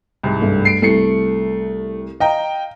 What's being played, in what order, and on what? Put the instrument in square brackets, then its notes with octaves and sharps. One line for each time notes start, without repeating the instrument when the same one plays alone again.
[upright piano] C2 G#2
[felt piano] G2 A3
[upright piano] C7 D7
[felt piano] C2 [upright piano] A3 C7 C#7
[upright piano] D#5 G5 A#5 [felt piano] F5